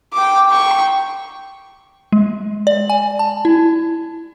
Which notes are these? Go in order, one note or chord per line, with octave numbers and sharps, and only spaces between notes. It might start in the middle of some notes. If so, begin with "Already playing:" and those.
G5 D6
G5 C#6
G#3
D5
G#5
A5
E4